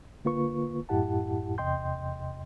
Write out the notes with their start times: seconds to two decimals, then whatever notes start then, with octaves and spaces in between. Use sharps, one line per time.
0.25 D3 A#3 F4 B4 C#6
0.89 F#2 A2 E4 G4 F#5 A5
1.58 E2 C3 D#5 G5 C6 G6